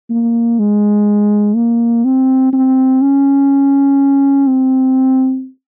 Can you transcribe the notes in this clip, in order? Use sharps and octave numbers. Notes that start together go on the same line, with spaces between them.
A#3
G#3
A#3
C4
C4
C#4
C4